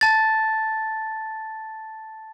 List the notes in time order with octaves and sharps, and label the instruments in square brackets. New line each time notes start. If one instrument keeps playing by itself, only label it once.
[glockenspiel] A5 A6